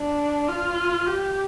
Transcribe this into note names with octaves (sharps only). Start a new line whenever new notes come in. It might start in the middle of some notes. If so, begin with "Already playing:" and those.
Already playing: D4
F4
G4